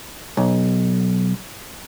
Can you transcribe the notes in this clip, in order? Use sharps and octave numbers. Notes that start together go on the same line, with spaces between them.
B1